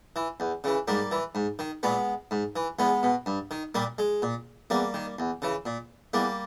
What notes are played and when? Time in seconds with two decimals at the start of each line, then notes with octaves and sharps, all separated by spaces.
0.16 E3
0.40 E2
0.64 C#3 E3
0.88 G#2 G3 A#3
1.12 E3
1.35 G#2
1.59 D#3
1.83 A#2 G#3 B3
2.31 G#2
2.56 E3
2.79 E2 G#3 B3
3.03 B2
3.26 G2
3.51 D#3
3.75 A#2 G3 A#3
3.98 G#3
4.22 A#2
4.70 E2 G3 A#3
4.94 D#3
5.19 E2
5.42 C#3 E3
5.66 A#2
6.13 E2 G3 A#3